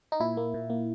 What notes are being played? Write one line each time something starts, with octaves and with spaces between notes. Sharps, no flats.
D#4
A#2 E4
A#3
A#2
A#3